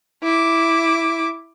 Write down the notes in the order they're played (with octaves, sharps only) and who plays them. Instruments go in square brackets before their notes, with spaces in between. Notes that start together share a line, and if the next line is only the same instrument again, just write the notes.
[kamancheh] E4 D6